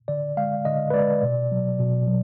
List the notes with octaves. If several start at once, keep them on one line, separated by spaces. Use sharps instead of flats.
D3 D5
G#3 F5
D3 D#5
B4
G#3 D5
B2
F#3
B2
F#3